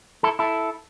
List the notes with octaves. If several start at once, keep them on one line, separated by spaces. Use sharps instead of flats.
E4 A4
E4 A4